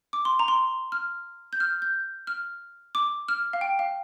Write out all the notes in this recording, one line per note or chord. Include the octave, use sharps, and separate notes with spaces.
D6
C6
A#5
C6
F6
G6
F6
G6
F6
D6
F6
F5
G5
F5